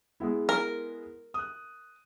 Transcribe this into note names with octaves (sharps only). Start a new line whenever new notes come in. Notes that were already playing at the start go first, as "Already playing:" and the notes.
G#3 B3 E4
A#4
D#6 F#6